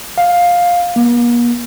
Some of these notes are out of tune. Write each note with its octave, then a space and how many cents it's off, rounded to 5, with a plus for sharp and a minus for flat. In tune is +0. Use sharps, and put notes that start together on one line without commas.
F5 +10
A#3 +45